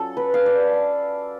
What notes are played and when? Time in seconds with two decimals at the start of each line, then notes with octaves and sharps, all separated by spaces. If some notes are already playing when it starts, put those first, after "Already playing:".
Already playing: F#3 C#4 F4 A4
0.17 B4
0.34 F5
0.46 D5